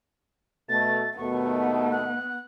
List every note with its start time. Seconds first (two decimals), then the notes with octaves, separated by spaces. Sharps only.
0.69 B2 A3 A6
1.18 D#2 B2 A3 B3 C#6
1.92 F#6